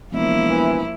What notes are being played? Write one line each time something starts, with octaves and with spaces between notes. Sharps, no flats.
E1 F3 A#3 E4
E3